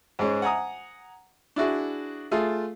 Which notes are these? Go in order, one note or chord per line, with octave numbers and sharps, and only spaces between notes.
G#2 G#3 C#4
F#5 G#5 A#5 D#6
D4 E4 F#4 G#4
A3 F4 G#4